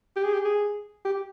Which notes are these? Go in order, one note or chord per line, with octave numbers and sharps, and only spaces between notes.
G4
G#4
G4
G#4
G4